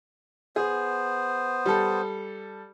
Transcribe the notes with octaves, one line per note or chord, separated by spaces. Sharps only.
B3 G#4 C5
G3 A4